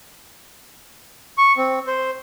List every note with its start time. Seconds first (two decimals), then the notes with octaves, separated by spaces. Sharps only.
1.38 C#6
1.57 C4
1.87 C5